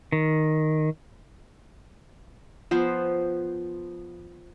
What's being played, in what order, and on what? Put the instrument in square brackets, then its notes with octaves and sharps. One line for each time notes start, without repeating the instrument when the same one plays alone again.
[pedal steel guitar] D#3
[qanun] F3 B3 C5